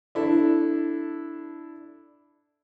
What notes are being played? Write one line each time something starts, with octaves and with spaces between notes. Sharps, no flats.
D4 E4 A4